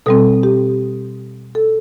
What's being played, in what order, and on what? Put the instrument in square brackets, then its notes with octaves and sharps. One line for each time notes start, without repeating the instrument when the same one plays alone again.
[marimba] B2 G3 C4 A4
G4
A4